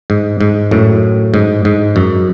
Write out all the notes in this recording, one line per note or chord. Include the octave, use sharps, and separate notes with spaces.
G#2
G#2
F#2 A2
G#2
G#2
F#2